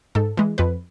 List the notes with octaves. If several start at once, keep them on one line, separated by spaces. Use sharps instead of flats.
G#2 A4
E3 G#3
F2 B4